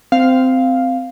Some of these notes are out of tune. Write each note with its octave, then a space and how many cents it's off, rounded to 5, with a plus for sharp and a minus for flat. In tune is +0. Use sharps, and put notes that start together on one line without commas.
C4 -15 F5 +0